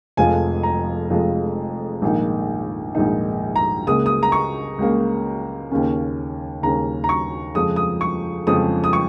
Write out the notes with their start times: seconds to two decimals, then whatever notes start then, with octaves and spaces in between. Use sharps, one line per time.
0.17 F1 F2 F3 G#3 F4 G#5
0.63 A#5
1.09 F1 F2 F3 G#3 F4
2.02 A#1 G#2 D#3 A#3 D#4
2.95 A#1 G#2 D#3 A#3 D#4
3.56 A#5
3.87 C#2 C#3 A#3 D#6
4.06 D#6
4.23 A#5
4.32 C#6
4.78 C#2 C#3 A#3
5.71 D#2 C#3 A#3 C#4
6.63 D#2 C#3 A#3 C#4 A#5
7.04 A#5
7.09 C#6
7.55 F2 C#3 F3 G#3 D#6
7.76 D#6
8.01 C#6
8.47 F2 C#3 F3 G#3 D#6
8.84 D#6
8.93 C#6